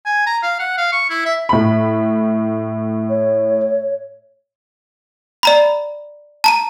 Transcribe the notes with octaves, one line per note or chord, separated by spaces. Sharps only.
G#5
A#5
F5
F#5
F5
C#6
E4
E5
A2 B5
C#5
D5 A#5 B5
A5 A#5 D#7